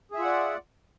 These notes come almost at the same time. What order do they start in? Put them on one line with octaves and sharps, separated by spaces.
G#4 E5 F4 F#5 D5